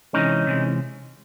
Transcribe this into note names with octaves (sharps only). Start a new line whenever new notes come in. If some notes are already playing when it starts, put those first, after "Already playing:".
C3 E3 G#3 C#4 D#4
C3 E3 G#3